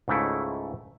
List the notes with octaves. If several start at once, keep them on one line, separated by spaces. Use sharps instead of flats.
C#2 G#2 C#3 A3 E4